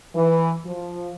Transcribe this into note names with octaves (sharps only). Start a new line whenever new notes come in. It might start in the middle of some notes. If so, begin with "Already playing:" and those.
E3
F3